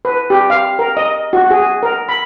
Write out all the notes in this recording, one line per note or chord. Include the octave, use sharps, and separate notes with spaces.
B4
G4
F5
A#4
D#5
F#4
G#4
A#4
B5